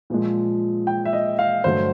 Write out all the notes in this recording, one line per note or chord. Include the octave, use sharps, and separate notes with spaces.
A#2 F3 G#3
G5
E5
D#5
F5
G2 D3 F#3 A3 C5